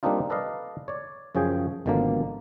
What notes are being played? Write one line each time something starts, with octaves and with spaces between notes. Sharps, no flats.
G3 A#3 C4 D4 D#4 F4
A4 B4 D5 D#5 F5
C#5 D5
F#2 C#3 F3 C#4 G#4 G5
G#1 B2 D3 F3 A#3